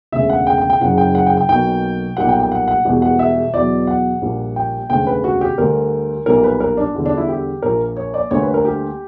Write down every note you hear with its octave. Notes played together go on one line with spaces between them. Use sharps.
E1 D2 C#3 E5
F#5
G5
G5
G5
F#1 F#2 C#3 F#5
G5
F#5
G5
G5
B1 B2 F#3 A#3 G5
B1 A#2 G3 A#3 F#5
G5
G5
F#5
F#5
E1 E2 B2 G3
F#5
E5
E2 B2 F#3 D5
F#5
A#1 A#2 G3 A#3
G5
E1 D2 C#3 G5
B4
F#4
G4
D2 D3 G3 A#4
B1 A#2 G3 A#3 A#4
B4
A#4
D4
E2 D3 G3
D4
E4
G4
A#1 A#2 A#3 A#4
C#5
D5
D2 D3 G3 A#3 C#5
B4
A#4
G4